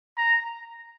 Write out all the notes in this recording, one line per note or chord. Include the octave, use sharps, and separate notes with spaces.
A#5